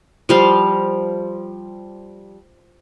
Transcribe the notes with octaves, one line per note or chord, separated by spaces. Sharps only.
F3 G3 F5